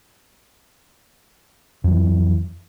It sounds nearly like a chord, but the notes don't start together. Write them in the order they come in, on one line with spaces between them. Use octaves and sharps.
F2 F#3 E3